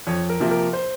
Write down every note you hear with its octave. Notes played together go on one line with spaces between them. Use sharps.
F2 C#5
A#4
C3 F3 A#3
A#4
C5